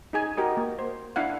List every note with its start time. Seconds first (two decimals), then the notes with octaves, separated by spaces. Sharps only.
0.13 D#4 G#4 G#5
0.37 F#4 G4 A#4 D#5
0.57 A#3
0.79 C5
1.16 D4 E4 F5 F#5